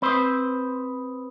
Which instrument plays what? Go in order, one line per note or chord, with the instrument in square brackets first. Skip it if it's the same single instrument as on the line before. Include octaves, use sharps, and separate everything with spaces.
[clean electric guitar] C4 B4 C5 [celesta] B5 D#6